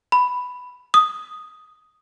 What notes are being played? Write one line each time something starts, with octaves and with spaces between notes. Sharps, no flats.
B5
D#6